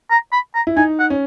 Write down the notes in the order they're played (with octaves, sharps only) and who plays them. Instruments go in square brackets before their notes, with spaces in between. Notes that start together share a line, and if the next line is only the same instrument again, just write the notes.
[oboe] A#5
B5
A#5
[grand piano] E4
[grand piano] D#4 [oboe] G#5
[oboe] F#5
[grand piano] C#4